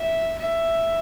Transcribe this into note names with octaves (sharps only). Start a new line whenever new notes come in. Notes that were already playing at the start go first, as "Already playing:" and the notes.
Already playing: E5
E5